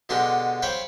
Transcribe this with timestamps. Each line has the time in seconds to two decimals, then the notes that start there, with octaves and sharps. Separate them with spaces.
0.09 B2 D3 G#3 G4 C6
0.62 C5 C#5 F5 G5 B5